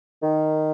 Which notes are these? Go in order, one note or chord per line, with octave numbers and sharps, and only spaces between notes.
D#3